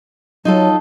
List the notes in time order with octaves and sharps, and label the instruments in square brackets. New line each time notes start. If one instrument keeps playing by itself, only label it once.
[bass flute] F#3 [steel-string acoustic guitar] D#4 F4 A4